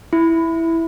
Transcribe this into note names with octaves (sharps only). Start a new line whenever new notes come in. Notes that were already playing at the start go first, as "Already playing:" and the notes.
E4